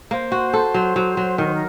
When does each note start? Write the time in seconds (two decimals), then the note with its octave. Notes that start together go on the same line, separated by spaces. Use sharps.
0.11 A#3 C5
0.32 F#4
0.53 A4
0.74 F#3
0.96 F#3
1.17 F#3
1.38 D#3 A#4
1.46 C5
1.53 A#4